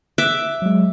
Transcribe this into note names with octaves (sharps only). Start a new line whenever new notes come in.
E5 D6 F#6
F#3 G#3